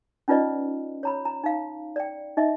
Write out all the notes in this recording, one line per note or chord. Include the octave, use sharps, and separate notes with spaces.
C#4 D#4 F4 B4 D5 D#5
C#5 A#5 B5
A#5
D#4 F5
D5 G5
D#4 D#5 E5